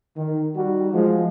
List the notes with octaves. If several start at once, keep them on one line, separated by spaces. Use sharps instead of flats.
D#3
G3 D#4 F#4
F3 G#3